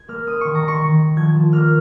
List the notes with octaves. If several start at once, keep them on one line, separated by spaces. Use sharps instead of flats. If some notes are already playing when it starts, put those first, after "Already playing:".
Already playing: G#6
A#3 F6
C#4 D#6
D#3 C#6
A#5
D#3
C#6
D#3
D#3
F3 G#6
F3
A#3 F6